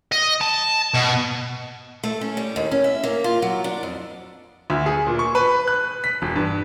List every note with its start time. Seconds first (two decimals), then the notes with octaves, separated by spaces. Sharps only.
0.12 D#5
0.41 A5
0.94 B2
2.03 A3
2.21 C#4
2.37 G3
2.56 D#2
2.71 C#4
2.84 E5
3.04 A#3
3.24 F4
3.42 F#3
3.64 D4
3.83 F2
4.70 D2
4.86 G#4
5.07 A#2
5.19 C#6
5.35 B4
5.67 F#6
6.04 B6
6.22 E1
6.36 G2